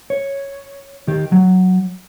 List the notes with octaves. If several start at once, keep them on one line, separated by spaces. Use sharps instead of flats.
C#5
D#3 G4
F#3